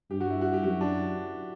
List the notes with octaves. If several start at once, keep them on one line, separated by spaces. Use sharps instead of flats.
G2 G4
F#4
E4
F#4
G4
F#2 F#4
D4